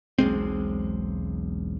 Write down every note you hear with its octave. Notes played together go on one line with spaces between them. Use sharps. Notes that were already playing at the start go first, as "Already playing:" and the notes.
E1 B1 G#3 C4